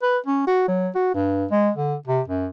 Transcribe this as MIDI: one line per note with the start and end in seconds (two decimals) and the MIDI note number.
0.02 0.18 71
0.26 0.45 61
0.47 0.64 66
0.68 0.89 54
0.95 1.11 66
1.15 1.45 43
1.51 1.70 56
1.76 1.95 50
2.07 2.21 48
2.28 2.48 42